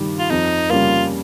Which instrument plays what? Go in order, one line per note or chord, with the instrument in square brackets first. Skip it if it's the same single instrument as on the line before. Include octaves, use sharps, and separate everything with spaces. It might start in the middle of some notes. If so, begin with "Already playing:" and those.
Already playing: [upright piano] G2 D#3 G3
[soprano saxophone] F4
[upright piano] F2 [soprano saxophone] D#4
[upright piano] C#3 G3 A#3 [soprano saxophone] F4